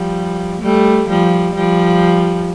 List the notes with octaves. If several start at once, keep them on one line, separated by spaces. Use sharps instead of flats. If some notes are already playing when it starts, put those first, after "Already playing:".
Already playing: F3 G3
G3 A3
F3 G3
F3 G3